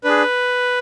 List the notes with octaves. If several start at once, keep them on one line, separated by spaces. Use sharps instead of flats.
D4 G#4 B4